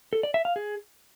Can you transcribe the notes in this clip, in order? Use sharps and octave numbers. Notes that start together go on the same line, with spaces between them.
A4
D5
E5
F5
G#4